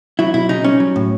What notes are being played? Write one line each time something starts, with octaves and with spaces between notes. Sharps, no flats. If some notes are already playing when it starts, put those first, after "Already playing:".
F#3 E4
B2 E4
C#3 D#4
G3 C#4
F#3
A2